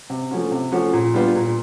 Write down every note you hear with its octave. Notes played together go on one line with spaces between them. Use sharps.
C3
F3 A3 C#4 F#4
C3
F3 A3 C#4 F#4
A#2
G3 B3 D4 F4
A#2